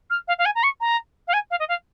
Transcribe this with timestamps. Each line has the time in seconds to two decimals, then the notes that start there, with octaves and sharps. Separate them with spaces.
0.10 F6
0.28 F5
0.38 F5
0.45 G#5
0.55 A#5
0.63 C#6
0.81 A#5
1.28 F5
1.33 G#5
1.51 F5
1.59 D#5
1.68 F5